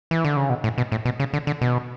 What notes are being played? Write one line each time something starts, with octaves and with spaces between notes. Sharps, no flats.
E3
D3
C#3
B2
A2
B2
A2
B2
C#3
D3
D3
B2